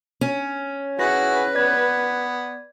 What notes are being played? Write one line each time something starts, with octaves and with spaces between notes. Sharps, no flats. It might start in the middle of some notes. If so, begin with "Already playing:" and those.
C#4
E4 F#4 G#4 B4 A#6
B3 D5 G#6